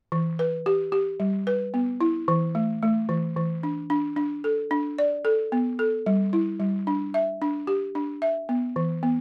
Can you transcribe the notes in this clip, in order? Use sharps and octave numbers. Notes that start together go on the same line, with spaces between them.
E3
B4
G4
G4
G3
B4
B3
E4
E3
A3
A3
E3
E3
D4
D4
D4
A4
D4
D5
A4
B3
A4
G3
E4
G3
D4
E5
D4
G4
D4
E5
B3
E3
B3